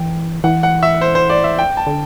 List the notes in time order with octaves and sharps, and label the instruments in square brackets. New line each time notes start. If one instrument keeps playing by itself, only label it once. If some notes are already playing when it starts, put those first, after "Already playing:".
Already playing: [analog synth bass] E3 [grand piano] G5
[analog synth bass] E3 [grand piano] F#5
[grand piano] F#5
E5
C5
C5
D5
E5
G5
A5
[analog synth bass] D3